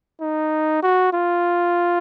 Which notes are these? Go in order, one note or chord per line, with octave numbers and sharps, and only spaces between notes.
D#4
F#4
F4